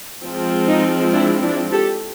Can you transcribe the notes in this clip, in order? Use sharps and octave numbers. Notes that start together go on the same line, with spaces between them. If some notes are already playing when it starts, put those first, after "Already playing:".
F3 G#3 C4
D#4
D4 E4
D4 E4
G4 A4